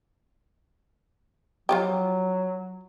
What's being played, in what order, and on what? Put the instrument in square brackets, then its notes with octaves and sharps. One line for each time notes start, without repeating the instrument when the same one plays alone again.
[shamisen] F3 F4 G4 [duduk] F#3